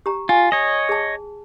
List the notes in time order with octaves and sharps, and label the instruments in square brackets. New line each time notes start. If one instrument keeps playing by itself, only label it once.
[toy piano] G4 A#5
[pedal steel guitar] F4 [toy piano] G#5
[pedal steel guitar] C#5 D#5
[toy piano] G#4 A5